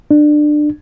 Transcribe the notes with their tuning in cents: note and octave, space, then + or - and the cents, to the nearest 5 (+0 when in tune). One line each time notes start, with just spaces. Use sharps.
D4 +25